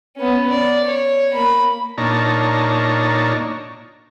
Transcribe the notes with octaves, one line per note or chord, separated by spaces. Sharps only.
B3 C#4
D5
C#5
A#3 B5
A#2 D4 D#4 C#5 A5 A#5